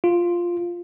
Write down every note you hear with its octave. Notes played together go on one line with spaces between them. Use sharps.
F4